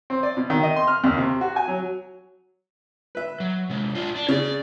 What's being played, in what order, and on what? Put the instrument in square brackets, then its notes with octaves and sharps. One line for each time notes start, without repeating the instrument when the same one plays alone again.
[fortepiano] C4
D5
B2
D#3
D#5
C6
F6
D#2
C3
F#4
G#5
F#3
B4 E5
[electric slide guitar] F#3
C3 G#3
D4 F4
D4
[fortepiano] C#3 [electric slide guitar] C#5 D5